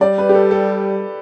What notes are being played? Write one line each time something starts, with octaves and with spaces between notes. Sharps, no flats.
G3 D5
B4
G4
A4
A4